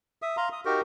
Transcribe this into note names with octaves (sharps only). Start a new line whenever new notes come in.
E5 D#6
F5 A#5 C6
D#6
D#4 F#4 G4 A#4